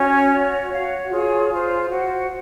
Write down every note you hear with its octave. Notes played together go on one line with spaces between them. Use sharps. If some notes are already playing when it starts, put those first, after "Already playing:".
Already playing: C#4 F#4 C#5
F#4 C#5
F#4 C#5 F5
F4 G#4 C#5
F4 C5
F#4 C5